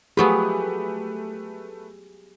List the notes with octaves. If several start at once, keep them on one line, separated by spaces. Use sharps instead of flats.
F3 F#3 A3 B3 G4 G#4 B4 B5